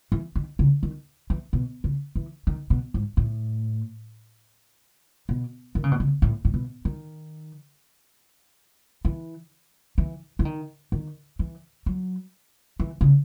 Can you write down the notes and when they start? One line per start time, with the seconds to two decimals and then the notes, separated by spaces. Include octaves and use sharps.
0.12 E3
0.36 D#3
0.59 C#3
0.83 D#3
1.30 E3
1.53 B2
1.84 C#3
2.15 E3
2.47 D#3
2.70 B2
2.94 G#2
3.17 A2
5.29 B2
5.75 D#3
5.84 C#3
5.92 B2
6.00 C#3
6.22 A2
6.45 A2
6.54 B2
6.85 D#3
9.05 E3
9.98 E3
10.39 E3
10.45 D#3
10.92 D#3
11.39 E3
11.86 F#3
12.80 E3
13.01 C#3